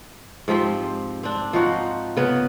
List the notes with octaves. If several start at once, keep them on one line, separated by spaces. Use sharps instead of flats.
G#2 F3 C4 G4
C4 D4
F3 D#4 F#4
C#3 B3